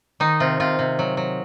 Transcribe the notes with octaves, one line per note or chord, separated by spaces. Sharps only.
D#3 D#4
C3 F4
C3 F4
C3
F#3
F#3